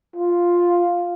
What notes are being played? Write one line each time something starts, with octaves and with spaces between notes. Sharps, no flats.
F4